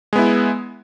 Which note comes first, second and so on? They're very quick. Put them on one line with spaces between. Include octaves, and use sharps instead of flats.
G#3 B3 E4